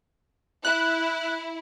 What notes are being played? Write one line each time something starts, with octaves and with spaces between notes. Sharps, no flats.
E4 F#6